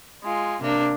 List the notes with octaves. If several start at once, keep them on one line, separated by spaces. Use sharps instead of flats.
G#3 F4
C3 A#3 D4